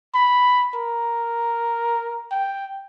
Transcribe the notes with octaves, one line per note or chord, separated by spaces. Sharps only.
B5
A#4
G5